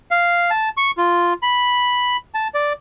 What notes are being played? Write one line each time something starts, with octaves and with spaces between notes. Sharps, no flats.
F5
A5
C#6
F4
B5
A5
D5